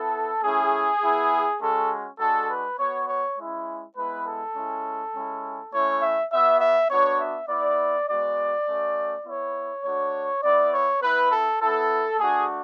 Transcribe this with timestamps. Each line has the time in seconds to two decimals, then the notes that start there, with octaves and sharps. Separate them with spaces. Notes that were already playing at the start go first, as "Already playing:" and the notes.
Already playing: B3 E4 A4
0.43 A3 C#4 E4 G#4
1.02 B3 E4
1.61 G#3 C#4 F#4 A4
2.20 G#3 D4 F#4 A4
2.50 B4
2.79 B3 F#4 C#5
3.08 C#5
3.38 G#3 C#4 E4
3.96 G#3 B3 E4 B4
4.27 A4
4.55 G#3 C#4 E4
5.15 G#3 C#4 E4
5.73 A3 C#4 E4 C#5
6.02 E5
6.32 B3 F#4 E5
6.61 E5
6.91 B3 D4 F#4 C#5
7.20 E5
7.49 B3 E4 D5
8.08 G#3 B3 F#4 D5
8.68 A3 C#4 F#4
9.26 B3 E4 C#5
9.84 A3 D4 F#4 C#5
10.43 B3 E4 D5
10.73 C#5
11.02 B3 E4 B4
11.32 A4
11.61 B3 E4 A4
12.20 A3 D4 F#4 G#4